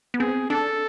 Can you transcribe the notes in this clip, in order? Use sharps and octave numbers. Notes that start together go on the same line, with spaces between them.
B3
C4 G#4
D4 A4